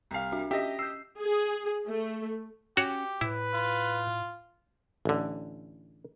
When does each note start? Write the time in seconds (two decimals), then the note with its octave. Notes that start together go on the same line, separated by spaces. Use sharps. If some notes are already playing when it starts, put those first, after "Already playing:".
0.11 C2 F5
0.32 D4 F#4 E5
0.51 C#4 G4 D#5 E5
0.79 E6 G6 C7
1.20 G#4
1.87 A3
2.77 C#4 F#4 G4 C#5
3.21 A2 E4 B4
3.54 F4
5.05 A1 D3